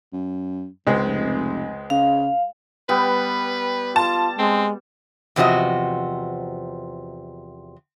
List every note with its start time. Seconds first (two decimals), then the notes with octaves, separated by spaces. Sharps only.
0.13 F#2
0.87 G#1 C#2 G#3 C4
1.06 F1
1.90 C#3 F5
2.89 G3 B3 B4 G5
3.96 F4 A5
4.39 G#3 C4
5.36 E2 C3 F3 F#4 D#5